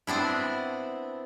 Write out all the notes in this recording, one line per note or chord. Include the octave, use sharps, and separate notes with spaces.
B3 C4 D4 E4